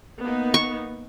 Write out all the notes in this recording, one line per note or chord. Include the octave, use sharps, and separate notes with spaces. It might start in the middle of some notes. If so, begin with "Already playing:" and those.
A#3 B3 D#4
C#6